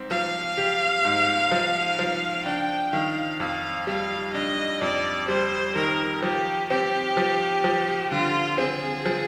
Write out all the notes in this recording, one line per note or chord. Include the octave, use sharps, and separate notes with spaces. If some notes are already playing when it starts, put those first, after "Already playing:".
Already playing: G#2 C4
F3 F5
G4
G#2
F3
F3
D4 G5
D#3 F5
F2 F5
G3 F5
D4 D#5
F2 D5
G3 C5
D#3 A#4
F3 G4
C4 G4
F3
F3
D3 F4
C4 G#4
F3